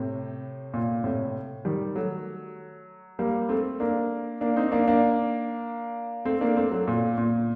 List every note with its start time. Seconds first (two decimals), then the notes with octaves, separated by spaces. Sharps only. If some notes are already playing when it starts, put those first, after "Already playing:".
Already playing: A2 C3
0.74 A#2
1.04 A2 C3
1.65 D#3 G3
1.96 F#3 A3
3.19 G3 A#3
3.49 A3 C4
3.80 A#3 D4
4.41 A#3 D4
4.56 C4 D#4
4.72 A#3 D4
4.88 A#3 D4
6.25 A3 C4
6.41 A#3 D4
6.56 A3 C4
6.71 F#3 A3
6.88 A#2
7.18 A#2